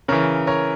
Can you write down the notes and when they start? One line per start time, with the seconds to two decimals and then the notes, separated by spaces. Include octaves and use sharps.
0.08 C#3 E3 A#4 C#5
0.47 A#4 C#5